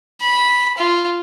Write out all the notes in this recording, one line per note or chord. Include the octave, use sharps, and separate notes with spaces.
B5
F4